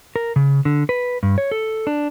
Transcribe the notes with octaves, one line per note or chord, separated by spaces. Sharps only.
A#4
C#3
D3
B4
G2
C#5
A4
D4